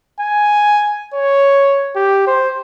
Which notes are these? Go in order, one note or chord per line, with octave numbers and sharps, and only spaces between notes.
G#5
C#5
G4
C5